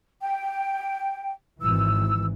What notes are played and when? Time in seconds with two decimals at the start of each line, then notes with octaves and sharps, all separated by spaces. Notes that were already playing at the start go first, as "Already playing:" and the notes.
0.22 G5
1.62 G#1 E3 E6